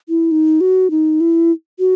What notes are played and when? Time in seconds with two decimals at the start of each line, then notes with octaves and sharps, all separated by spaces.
0.09 E4
0.31 D#4
0.61 F#4
0.91 D#4
1.20 E4
1.79 F#4